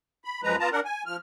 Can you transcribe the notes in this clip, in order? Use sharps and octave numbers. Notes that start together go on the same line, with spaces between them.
B5
F#2 F3 G#3 B4 A#5
B3 F4 A5 A#5
D4 A#4 F#5
G#5
F3 F6